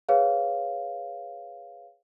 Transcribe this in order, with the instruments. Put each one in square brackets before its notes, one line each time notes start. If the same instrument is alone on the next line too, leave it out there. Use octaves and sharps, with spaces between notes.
[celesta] G#4 B4 C#5 F5